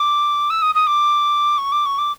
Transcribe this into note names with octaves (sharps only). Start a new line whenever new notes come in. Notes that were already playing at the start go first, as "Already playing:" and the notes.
Already playing: D6
E6
D#6
D#6
D6
C#6
D6
C#6
D6